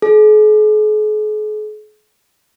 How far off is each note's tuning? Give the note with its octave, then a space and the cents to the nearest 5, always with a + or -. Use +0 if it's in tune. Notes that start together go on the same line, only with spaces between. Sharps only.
G#4 +45